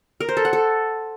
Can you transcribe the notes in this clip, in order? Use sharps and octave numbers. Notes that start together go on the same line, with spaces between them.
A#4
C5
A4
F#5
A4